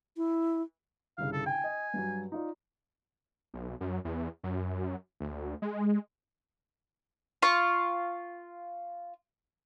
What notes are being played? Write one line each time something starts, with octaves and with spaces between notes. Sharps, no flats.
E4
G1 C2 C#3 F5
A4
G5 G#5
D#5
G2 F#3
D#4 F4 D5
B1
F#2
E2
F#2
D2
G#3
F4 F5 C#6